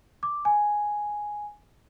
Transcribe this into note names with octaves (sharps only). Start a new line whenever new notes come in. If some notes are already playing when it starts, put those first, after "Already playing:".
D6
G#5